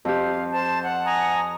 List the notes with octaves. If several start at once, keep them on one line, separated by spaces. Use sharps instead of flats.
F2 G4 C5 F5
C5 A5
F#5
G#5 A#5 D#6